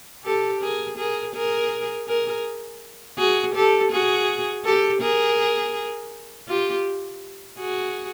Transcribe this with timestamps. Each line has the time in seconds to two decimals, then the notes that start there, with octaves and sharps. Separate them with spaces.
0.24 G4 A4
0.61 G#4 A#4
0.98 G#4 A#4
1.35 G#4 A#4
2.07 G#4 A#4
3.18 F#4 G#4
3.54 G4 A4
3.91 F#4 G#4
4.64 G4 A4
5.01 G#4 A#4
6.48 F4 G4
7.59 F#4 G#4